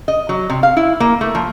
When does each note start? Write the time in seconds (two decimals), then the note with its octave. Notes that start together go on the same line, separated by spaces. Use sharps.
0.08 D#5
0.29 F#3
0.50 C3
0.63 F5
0.77 E4
1.00 A#3
1.21 A3
1.35 F3